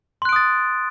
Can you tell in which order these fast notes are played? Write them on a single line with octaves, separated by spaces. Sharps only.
C6 F#6 D7 D#6 A6